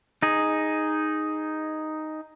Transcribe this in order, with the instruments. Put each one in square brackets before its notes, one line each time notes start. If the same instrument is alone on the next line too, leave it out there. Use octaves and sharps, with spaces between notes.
[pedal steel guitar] D#4 G#4